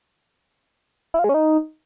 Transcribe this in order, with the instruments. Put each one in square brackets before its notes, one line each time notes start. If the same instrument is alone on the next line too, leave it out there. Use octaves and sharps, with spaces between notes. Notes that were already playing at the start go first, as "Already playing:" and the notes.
[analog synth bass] E4
F4
G#3
C#4
D#4